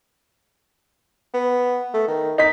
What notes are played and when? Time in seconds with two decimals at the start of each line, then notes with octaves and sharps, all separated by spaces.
1.34 B3
1.94 A3
2.08 D#3
2.38 D#4 B6